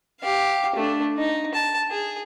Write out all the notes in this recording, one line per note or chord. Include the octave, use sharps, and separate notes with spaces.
G4 F5
A3 D4
D#4
A5
G#4